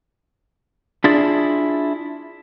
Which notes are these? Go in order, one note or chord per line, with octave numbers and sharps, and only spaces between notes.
D4 E4 F4 G#4 D5